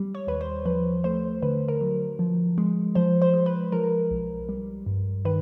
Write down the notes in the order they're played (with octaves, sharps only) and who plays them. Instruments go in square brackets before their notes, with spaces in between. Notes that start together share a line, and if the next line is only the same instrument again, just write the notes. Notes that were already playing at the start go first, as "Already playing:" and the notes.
Already playing: [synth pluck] G3
C#5
D#2 B4
C5
F3 B4
A3 C5
D3 B4
A#4
F#3
F3
G#3
F3 C5
C5
G#3
B4
F3 A#4
B1
G3
G2
D#3 B4